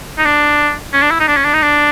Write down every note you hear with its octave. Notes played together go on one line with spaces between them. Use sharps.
D#4
D4
C#4
D4
E4
D#4
D4
C#4
D4
D#4
D4